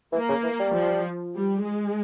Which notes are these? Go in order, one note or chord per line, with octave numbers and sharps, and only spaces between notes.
E3 A#3
C#3
E3
G3
F3
G3
G#3